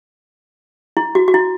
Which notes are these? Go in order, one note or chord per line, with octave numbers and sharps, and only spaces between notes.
E4
F#4
F#4
E4